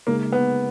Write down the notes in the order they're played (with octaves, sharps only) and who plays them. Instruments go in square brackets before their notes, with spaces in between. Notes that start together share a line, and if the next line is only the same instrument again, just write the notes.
[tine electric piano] C#3 G#3 D#4 G#4 [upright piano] A#3
[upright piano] B3